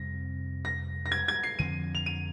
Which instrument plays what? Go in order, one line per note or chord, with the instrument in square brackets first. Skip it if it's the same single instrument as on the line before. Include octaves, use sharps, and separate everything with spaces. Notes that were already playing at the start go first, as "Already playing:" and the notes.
Already playing: [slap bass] F2 C3 G3 C4 [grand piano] A#6
[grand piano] A#6
A#6
G#6
G#6
C7
[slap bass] F2 D3 F3 C4 [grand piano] D#7
[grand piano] F7
D#7